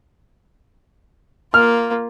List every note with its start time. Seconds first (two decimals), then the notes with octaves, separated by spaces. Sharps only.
1.54 A#3 F4 F6